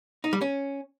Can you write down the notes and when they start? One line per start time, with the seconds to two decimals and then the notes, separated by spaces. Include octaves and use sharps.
0.24 D#4
0.33 G3
0.41 C#4